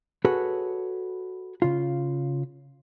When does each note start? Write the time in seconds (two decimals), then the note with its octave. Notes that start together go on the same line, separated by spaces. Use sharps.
0.25 F#4 G#4 A4 B4 C#5
1.62 C#3 F4